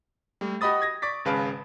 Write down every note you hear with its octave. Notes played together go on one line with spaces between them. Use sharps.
G3 A3
F#4 G4 D#5 B5 D#6 A6
G#6 A#6
D5 C#6 D6 A6 B6
G#1 C#3 B4 F5 A5 D7